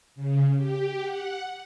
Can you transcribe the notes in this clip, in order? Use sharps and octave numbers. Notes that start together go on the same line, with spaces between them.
C#3
G4
F#5